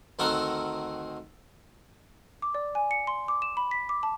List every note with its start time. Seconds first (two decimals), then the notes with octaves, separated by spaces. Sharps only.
0.19 D2 D#3 C4 A4 A#4 F#5
2.42 D6
2.55 D5
2.75 G#5
2.91 C#7
3.07 C6
3.28 D6
3.42 E7
3.57 B5
3.71 B6
3.89 D6
4.03 A5